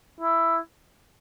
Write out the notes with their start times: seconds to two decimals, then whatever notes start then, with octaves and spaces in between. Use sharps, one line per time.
0.21 E4